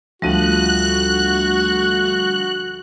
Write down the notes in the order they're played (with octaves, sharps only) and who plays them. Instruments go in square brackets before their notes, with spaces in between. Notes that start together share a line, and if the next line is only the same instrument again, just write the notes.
[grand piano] D2 F3 D#7 [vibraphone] G3 [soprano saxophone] F#4 [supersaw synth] F#6